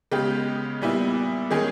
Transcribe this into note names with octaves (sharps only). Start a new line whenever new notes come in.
C#3 G#3 B3 G4
A#2 G3 B3 E4
D#3 G#3 C#4 G#4